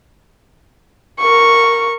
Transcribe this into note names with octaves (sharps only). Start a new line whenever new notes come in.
A#4 C#6